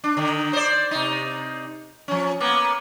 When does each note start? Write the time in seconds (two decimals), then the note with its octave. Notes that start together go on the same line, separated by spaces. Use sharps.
0.04 D4
0.17 D3 D#3
0.53 C5 D5
0.91 C3 D#4
2.08 F3 C#4
2.41 A#3 B3